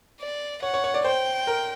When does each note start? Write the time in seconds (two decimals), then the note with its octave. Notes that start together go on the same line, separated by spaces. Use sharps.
0.20 D5
0.62 C#5 F#5
0.74 C#5
0.84 C#5
0.94 D5
1.04 C5 G5
1.47 A#4